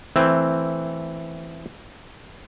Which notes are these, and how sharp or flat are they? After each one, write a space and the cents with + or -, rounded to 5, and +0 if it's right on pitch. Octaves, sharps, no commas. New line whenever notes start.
E3 +0 A3 +15 C4 +0